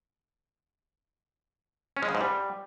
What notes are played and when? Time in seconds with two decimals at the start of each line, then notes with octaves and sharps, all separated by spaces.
1.97 C#4
2.03 G#3
2.09 C#3
2.15 G#2
2.21 G3